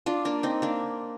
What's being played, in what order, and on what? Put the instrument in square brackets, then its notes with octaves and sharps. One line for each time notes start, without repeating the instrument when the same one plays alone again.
[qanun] D4 F4
A#3 D4
C4 D#4
A#3 D4